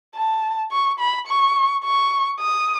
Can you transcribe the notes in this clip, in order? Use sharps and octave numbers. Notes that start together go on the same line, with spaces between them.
A5
C#6
B5
C#6
C#6
D#6